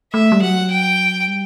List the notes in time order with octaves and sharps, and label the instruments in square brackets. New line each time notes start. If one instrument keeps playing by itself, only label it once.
[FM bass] A3 [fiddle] E5
[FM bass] G3
[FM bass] F#3 [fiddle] F#5
[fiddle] G5
[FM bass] G3